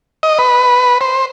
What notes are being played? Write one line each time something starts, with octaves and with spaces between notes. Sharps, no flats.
D#5
B4
C5